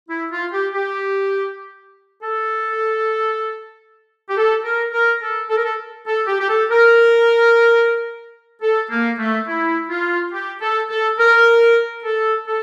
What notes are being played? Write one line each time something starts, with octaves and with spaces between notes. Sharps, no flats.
E4
F4
G4
G4
A4
G4
A4
A#4
A#4
A4
A4
A#4
A4
A4
G4
G4
A4
A#4
A4
A#3
A3
E4
F4
G4
A4
A4
A#4
A4
A4